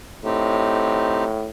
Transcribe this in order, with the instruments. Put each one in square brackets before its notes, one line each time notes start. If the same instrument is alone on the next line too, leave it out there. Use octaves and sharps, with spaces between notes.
[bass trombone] A2 [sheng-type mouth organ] C4 D#4 G4